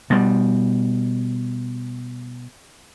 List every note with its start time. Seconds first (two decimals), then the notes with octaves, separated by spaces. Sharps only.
0.10 B2 G3